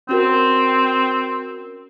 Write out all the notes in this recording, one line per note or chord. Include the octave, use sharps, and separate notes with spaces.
C4 C#4 F#4 A#4